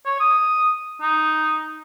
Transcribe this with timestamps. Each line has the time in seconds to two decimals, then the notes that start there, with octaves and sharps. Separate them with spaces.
0.05 C#5
0.20 D#6
1.02 D#4